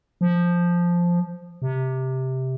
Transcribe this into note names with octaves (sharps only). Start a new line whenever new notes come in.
F3
C3